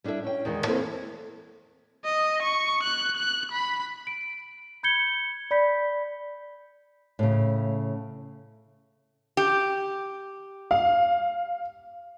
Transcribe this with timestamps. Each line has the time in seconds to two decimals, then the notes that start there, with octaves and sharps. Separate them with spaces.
0.04 G3 D4 E4 A4 E5
0.24 C#4 G5
0.45 E2 D#3 G#3
0.66 E3 A#3 C4 E4 A4 C5
2.05 D#5
2.43 C#6
2.84 F#6
3.17 F#6
3.52 B5
4.07 D7
4.83 B5 G6 G#6 C#7 G7
5.51 D5 B5 G6 B6
7.19 A2 C#3
9.37 G4
10.71 F5